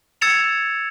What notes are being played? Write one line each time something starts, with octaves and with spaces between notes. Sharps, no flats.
E6 G#6 A6 C#7 E7 F7